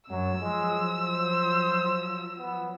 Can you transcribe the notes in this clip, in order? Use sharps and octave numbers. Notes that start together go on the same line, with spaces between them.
F#2 F#3 E6
F3 F#3 G#3
C5
B3